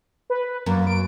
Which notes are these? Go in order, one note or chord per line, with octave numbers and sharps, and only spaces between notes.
B4
F#2 A#3
D7